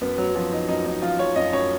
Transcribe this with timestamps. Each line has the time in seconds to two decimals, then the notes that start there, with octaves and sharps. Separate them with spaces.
0.01 F#2 B3
0.18 F#2 F#3
0.35 F3 F#3
0.52 F3 D#4
0.68 F#2 D#4
0.86 F#2 D#4
1.02 F3 F4
1.19 F3 C#5
1.36 F#2 D#5
1.53 F#2 C#5